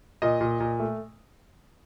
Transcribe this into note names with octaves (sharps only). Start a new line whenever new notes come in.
A#2 D#5
A#2
A#2
A3